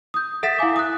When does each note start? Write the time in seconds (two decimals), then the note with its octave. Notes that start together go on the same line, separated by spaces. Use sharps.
0.14 D#6 G6
0.43 A4 E5 F#5 A6 B6 E7
0.59 E4 F5 G#5 D6
0.76 D#6 F#6